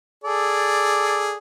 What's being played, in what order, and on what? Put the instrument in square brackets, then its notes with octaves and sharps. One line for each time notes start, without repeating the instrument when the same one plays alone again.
[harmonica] G#4 A4 D5